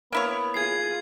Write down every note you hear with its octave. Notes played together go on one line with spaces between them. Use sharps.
A#3 B3 E4 C#5
F4 G#4 G#6 C7